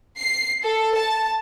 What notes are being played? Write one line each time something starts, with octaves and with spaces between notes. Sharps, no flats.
C7
A4
A5